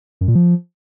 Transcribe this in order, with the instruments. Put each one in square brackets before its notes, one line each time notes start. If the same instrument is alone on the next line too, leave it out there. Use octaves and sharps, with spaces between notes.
[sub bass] F#2
A#2
F3